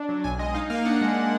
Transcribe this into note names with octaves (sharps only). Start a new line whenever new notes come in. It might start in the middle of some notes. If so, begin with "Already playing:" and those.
Already playing: D4
F#3
B1 G#5
G#3 D#5
D#4 F5
A#3 F5
D4 F#5
G#3